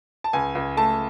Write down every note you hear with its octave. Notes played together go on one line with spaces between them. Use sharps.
A5
C#2 G#5
C#2
A3 A5